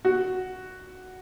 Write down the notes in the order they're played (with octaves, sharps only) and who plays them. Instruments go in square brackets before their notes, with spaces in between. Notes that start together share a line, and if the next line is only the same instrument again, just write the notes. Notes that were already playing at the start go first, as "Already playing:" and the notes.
[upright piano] F#4